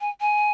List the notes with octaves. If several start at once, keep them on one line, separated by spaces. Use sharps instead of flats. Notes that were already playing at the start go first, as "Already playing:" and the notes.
G#5
G#5